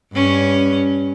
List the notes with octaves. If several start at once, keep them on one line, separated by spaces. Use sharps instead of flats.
G2 C#4